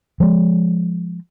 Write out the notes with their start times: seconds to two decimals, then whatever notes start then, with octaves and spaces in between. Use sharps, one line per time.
0.20 F3 G#3